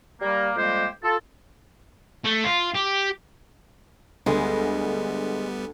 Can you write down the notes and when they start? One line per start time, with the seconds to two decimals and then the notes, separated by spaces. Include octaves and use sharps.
0.22 G3 A#3
0.57 F2 G3 G#3 A#3 G4 C5
1.04 F4 A4
2.25 A3
2.44 F4
2.75 G4
4.26 D2 G3 G#3 B3